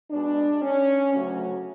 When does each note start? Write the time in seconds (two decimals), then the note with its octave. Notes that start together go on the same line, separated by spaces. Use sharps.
0.11 B2 G#3 D4
0.62 C#4
1.14 D2 C#3 F#3 A3 F#4